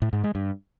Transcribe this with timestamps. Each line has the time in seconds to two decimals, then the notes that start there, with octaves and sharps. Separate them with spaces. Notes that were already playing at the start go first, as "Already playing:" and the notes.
0.02 A2
0.13 G#2
0.24 G#3
0.35 G2